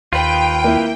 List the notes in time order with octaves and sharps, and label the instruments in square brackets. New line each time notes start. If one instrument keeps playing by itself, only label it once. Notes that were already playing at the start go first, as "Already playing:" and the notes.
[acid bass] D#2 [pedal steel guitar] F4 B4 [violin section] G5
[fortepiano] A#3 E4